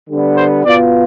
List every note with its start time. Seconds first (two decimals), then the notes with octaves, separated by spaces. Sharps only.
0.09 D3 G3 B3
0.37 C5
0.64 B2 B3 F4 D5